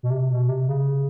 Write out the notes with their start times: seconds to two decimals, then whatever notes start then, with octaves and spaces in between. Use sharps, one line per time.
0.03 B2
0.10 C3
0.30 B2
0.48 C3
0.69 C#3